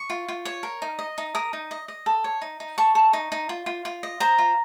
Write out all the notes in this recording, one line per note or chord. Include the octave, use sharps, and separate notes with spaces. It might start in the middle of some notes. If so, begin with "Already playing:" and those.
Already playing: C#6
F4
F4
C#5
A#4
D#4
D#5
D#4
A#4 D#6
D#4
D#5
D#5
A4
C#5
D#4
D#4
A4 C#6
A4
D#4
D#4
F4
F4
F4
D#5
C5 A#5
F4